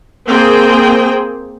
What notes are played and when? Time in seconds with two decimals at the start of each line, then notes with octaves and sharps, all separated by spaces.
0.28 A#3 C4 G#4 C5 G5